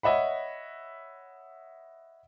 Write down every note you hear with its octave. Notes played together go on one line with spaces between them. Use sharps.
C#5 D#5 E5 F#5 B5